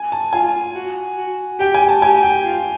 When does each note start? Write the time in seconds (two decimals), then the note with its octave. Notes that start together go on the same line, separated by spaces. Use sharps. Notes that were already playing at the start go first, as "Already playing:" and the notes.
Already playing: G#5
0.12 A5
0.33 F4 G#5
0.75 F#4
1.18 F#4
1.60 G4 G5
1.74 G#5
1.89 A5
2.02 G4 G#5
2.23 G5
2.44 F4